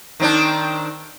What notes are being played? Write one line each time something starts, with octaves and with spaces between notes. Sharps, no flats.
D#3 C4 D4